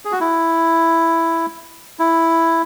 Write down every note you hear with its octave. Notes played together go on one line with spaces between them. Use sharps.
G#4
F#4
E4
E4